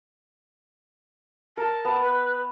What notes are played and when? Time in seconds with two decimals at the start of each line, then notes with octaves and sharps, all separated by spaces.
1.57 A#4 A5
1.85 B3
2.02 B4